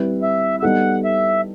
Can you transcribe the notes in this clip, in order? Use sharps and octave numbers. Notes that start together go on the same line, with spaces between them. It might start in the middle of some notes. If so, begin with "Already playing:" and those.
Already playing: G3 C4 E4 B4
E5
E5
G3 B3 D#4 A4 F#5
E5